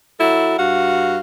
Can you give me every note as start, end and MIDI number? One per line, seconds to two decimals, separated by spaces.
0.20 0.56 54
0.20 0.56 64
0.20 0.56 66
0.20 0.56 69
0.58 1.19 43
0.58 1.19 66
0.58 1.19 77
0.58 1.19 78